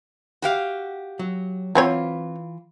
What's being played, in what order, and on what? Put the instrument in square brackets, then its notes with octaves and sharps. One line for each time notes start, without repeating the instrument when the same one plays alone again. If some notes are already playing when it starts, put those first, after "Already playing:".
[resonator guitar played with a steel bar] F#4 G4 F5
[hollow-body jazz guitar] F#3
[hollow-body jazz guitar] E3 F4 [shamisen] F#3 C4 C#5